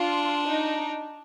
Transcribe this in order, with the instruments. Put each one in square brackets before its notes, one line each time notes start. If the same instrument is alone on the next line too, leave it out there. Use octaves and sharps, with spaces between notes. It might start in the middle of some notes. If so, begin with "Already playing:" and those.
Already playing: [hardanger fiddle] D4 [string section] F4
[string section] D#4